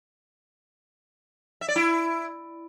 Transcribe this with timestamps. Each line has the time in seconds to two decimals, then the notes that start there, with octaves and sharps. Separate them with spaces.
1.61 E5
1.68 D5
1.76 E4